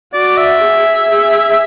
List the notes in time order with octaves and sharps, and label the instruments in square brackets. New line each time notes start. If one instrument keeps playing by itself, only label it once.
[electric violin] F#4 [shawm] D5
[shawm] E5
[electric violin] G#4
G#4
[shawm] E5